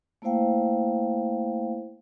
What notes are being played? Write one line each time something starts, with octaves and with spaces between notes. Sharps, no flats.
A3 A#3 E4 C5 F5 G5